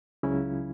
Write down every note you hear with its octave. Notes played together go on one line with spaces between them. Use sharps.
C#2 C#3 F#3 C#4 E4